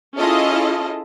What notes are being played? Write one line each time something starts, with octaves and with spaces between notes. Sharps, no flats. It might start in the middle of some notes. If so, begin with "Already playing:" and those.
C#4 E4 F4 G#4 A4 D#5